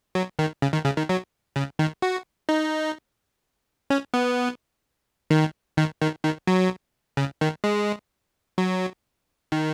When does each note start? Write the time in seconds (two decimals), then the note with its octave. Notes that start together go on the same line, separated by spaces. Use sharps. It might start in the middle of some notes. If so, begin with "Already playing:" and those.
0.15 F#3
0.39 D#3
0.62 C#3
0.73 D#3
0.85 C#3
0.98 D#3
1.09 F#3
1.56 C#3
1.79 D#3
2.02 F#4
2.49 D#4
3.90 C#4
4.14 B3
5.31 D#3
5.77 D#3
6.01 D#3
6.23 D#3
6.47 F#3
7.17 C#3
7.41 D#3
7.64 G#3
8.58 F#3
9.52 D#3